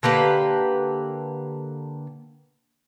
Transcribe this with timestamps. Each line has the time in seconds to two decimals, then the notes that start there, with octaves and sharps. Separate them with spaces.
0.03 D3 A#3 G4 B4